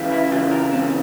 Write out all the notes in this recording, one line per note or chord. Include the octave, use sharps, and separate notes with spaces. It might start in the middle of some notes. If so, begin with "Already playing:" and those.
Already playing: C#2 C#3 E3
E4
C#2 C#3 E3 F4
A#4
C#2 C#3 E3 C4